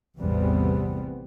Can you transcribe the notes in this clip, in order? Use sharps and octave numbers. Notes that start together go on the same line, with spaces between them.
A1 E2 C3 G3 B3 C4